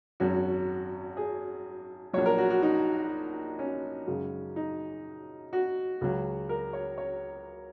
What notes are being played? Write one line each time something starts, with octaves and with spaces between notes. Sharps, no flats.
G#1 F#2 F#3 F#4
G#4
A#1 A#2 F#3 C#5
A#4
F#4
F#4
D#4
C#4
F#2 C#3 G#3
D#4
F#4
C#2 C#3 F#3
A#4
C#5
C#5